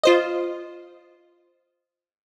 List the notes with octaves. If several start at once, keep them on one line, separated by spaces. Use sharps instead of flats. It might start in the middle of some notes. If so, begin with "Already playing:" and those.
F4 C5 D#5